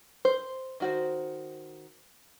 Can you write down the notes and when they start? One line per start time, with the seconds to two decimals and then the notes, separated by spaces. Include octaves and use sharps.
0.25 C5
0.80 D#3 F#4 C5